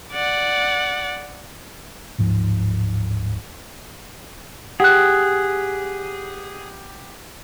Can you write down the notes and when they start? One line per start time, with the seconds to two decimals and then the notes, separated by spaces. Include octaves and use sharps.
0.13 D5 F#5
2.18 D1 G#2 F3
4.80 G4 G#4 F#5 F#6